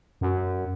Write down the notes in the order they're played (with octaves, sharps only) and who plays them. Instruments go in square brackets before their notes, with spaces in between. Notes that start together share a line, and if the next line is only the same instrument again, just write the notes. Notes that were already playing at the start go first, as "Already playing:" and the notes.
[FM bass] F#2